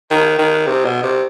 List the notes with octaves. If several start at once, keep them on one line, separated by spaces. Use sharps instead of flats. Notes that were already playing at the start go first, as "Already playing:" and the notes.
D#3
D#3
C3
B2
C3